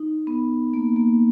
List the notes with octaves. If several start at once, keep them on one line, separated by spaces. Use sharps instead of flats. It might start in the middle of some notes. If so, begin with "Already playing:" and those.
Already playing: D#4
B3
A#3
A#3